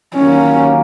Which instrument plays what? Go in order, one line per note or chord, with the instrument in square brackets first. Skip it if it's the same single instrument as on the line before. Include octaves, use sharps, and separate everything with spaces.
[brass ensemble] D#2 D#3 F#3 A#3 [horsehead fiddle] C#4